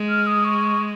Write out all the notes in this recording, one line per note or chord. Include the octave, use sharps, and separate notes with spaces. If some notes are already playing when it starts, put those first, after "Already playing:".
Already playing: G#3
F6
D#6
C#6